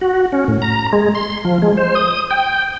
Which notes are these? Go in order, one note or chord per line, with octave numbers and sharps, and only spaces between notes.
F#4
C#4
A2
A#5
G#3
C6
F3
G#3
C5
D#6
G5